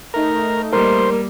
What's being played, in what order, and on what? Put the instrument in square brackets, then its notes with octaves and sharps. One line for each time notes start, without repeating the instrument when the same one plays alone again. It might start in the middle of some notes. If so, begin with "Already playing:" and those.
[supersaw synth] A3 D#4 [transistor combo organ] A#4
[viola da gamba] G3 A#3 [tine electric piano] A#4 [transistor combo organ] C5